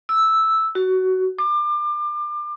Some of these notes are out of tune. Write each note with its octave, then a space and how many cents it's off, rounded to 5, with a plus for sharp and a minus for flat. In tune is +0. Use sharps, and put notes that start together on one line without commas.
E6 -5
F#4 +15
D6 +30